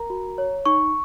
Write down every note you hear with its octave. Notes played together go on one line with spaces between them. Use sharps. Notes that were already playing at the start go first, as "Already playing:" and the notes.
Already playing: A#4 A#5
F#4
C#5
D#4 C#6